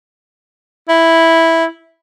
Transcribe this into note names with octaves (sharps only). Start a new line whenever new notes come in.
E4